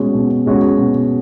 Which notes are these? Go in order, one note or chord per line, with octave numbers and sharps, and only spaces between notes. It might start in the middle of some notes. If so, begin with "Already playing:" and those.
Already playing: B2 G#3 C#4 F#4
B2
G#3 C#4 F#4
B2